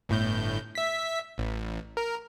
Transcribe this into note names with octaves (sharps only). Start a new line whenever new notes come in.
G1 A2 G6
E5 B6
A1
A#4